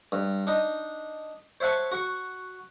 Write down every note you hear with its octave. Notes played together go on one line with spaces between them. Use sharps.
G2
D4 D#4
C5 C#5 E5 F#5 A5 C#6
F#4 C#6